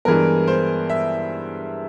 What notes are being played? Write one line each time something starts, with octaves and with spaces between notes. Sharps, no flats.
G2 E3 G#3 B3 A#4
C5
E5